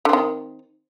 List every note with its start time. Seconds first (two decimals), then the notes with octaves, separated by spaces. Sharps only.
0.05 D3
0.09 C4
0.13 D#3